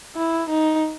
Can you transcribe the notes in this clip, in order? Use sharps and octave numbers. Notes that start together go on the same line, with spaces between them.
E4
D#4